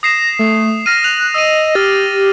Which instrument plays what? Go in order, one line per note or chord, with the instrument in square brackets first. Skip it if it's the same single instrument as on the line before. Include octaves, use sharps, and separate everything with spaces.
[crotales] D#6 C7 E7 [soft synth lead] A#6
[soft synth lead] A3
[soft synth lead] F6 [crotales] A#6 D#7
[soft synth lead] F#6 [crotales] F7
[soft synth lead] D#5 [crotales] E6 A#6 D#7
[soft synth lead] G4 [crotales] F6 A6